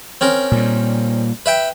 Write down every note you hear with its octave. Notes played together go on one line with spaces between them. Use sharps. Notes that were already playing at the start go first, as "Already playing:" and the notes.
C4 C#4 A#4
A#2 G3
B4 E5 G5